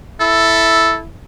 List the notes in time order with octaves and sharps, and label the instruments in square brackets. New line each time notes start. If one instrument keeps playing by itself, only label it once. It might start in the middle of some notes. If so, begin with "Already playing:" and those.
[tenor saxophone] E4 [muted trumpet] A4